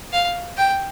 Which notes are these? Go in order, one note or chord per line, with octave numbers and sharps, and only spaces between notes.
F5
G5